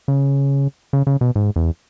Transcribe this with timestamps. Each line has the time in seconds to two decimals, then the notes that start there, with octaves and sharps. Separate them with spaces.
0.08 C#3
0.93 C#3
1.07 C#3
1.21 B2
1.36 G#2
1.56 E2